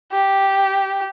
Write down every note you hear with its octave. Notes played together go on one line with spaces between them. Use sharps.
G4